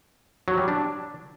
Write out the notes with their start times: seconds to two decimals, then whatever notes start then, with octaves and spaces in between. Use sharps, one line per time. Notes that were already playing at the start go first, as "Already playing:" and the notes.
0.48 F#3
0.58 G3
0.68 D4